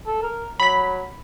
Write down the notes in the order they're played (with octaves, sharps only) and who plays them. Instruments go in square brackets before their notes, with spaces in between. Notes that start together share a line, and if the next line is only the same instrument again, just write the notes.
[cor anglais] A4
A#4
[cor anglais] F#3 [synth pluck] B5 B6